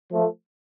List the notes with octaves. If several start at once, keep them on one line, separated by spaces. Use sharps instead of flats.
F3 A3